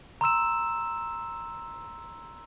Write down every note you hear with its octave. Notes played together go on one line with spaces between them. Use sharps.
A#5 C6 E6 E7